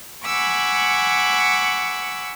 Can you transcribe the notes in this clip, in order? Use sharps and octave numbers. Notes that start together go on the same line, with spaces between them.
F#5 G#5 B5 C#6 D6 E6